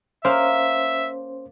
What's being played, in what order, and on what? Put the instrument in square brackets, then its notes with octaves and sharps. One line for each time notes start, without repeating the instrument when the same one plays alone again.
[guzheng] A#3 [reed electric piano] C#4 C5 [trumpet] E5